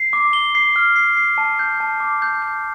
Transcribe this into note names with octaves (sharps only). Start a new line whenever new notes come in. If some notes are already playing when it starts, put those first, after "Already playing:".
Already playing: C7
D6
G7
C7
F6
C7
C7
A5
G6
A5
D6
G6
G6